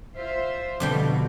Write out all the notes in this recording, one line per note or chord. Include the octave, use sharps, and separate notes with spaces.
F4 C5 E5
F2 B2 D3 G3 G5